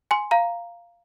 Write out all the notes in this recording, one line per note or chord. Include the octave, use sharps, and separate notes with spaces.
G#5 C6
F5 A#5